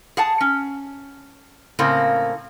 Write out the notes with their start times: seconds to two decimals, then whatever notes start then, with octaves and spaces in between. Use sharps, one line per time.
0.17 G#4 F#5 A5
0.41 C#4
1.79 A2 C#3 A#3 C4